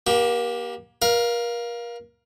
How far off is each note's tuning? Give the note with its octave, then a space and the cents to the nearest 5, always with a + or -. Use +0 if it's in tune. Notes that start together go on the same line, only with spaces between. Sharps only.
A#3 +35 G4 +0
A#4 +30 F5 +0